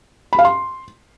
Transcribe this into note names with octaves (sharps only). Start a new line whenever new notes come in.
B5
F5
C6